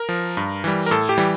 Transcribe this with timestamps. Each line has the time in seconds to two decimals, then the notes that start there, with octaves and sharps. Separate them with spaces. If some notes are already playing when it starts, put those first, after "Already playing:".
Already playing: A#4
0.09 F3
0.37 G2
0.64 E3 G3
0.86 A#4
0.91 A2 A4
1.09 G4
1.18 E3 G3